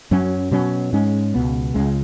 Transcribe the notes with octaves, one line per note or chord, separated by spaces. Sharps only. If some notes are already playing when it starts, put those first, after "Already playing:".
F#2 F#3 C#4
B2 F#3 C#4
G#2 G#3 C#4
C#2 B2 B3
C#2 C#3 G#3